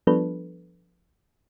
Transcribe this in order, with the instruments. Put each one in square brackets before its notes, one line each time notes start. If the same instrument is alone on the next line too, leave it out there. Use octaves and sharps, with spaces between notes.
[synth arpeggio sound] F3 G3 B3 D4 A4 B4